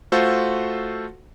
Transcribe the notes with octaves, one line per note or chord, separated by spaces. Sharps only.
A3 F4 F#4 A4 C5 F#5